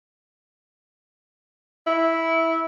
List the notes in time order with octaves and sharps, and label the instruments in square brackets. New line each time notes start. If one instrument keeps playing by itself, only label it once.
[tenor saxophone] E4